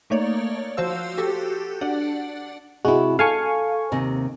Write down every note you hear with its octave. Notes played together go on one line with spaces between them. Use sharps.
A3 A#3 D#4 C#5 D5
F3 F#4 C5 F5 E6
F#4 G4 A4
D4 D5 F#5
C3 G#3 E4 F#4
A4 F5 G#5 C#6
D#2 C3 D#5